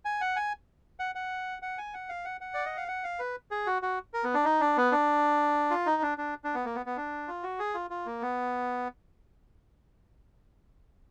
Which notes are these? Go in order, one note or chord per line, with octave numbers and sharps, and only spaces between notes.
G#5
F#5
G#5
F#5
F#5
F#5
G#5
F#5
F5
F#5
F#5
D5
D#5
F5
F#5
F5
B4
G#4
F#4
F#4
A#4
B3
D4
D#4
D4
B3
D4
F4
D#4
D4
D4
D4
B3
A#3
B3
B3
D4
F4
F#4
G#4
F4
F4
A#3
B3